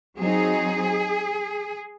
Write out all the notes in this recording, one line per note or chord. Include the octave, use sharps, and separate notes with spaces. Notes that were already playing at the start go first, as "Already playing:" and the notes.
F#3 C4 D#4 G#4